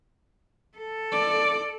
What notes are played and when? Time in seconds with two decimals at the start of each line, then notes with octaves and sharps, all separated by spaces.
0.77 A4
1.12 D5